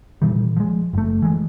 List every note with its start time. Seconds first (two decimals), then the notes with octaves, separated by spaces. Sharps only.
0.22 A#2 D#3 E3 G3
0.56 F3 G#3
0.93 F#1 A3
1.22 E3 G#3